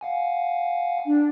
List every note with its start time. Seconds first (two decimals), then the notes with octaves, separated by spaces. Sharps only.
0.01 F5 F#5 G#5
1.06 D4